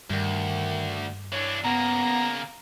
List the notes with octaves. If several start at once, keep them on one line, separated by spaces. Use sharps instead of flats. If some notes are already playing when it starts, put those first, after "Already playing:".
D2 G2 D#3
E3 D4 C#5
C#3 A#3 B3 A#5